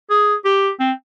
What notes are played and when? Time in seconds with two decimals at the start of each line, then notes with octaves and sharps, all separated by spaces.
0.10 G#4
0.45 G4
0.80 C4